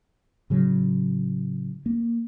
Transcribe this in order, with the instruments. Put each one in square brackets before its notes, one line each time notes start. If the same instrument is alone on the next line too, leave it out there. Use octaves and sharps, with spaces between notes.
[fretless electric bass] A2 C#3 F#3
A#3